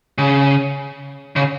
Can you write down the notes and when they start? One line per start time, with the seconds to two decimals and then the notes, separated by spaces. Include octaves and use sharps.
0.18 C#3
1.36 C#3